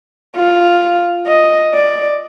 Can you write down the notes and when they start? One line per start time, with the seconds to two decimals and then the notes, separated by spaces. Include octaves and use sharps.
0.35 F4
1.27 D#5
1.74 D5